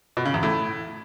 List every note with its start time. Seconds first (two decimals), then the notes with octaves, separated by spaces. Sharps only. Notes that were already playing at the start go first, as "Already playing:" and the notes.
0.17 B2
0.25 C#3
0.34 E2
0.43 A2